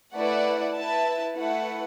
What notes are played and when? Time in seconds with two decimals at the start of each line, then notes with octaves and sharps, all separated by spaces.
0.15 A3 E4 B4 D5 F#5
0.75 E4 B4 E5 A5
1.35 A3 E4 B4 F#5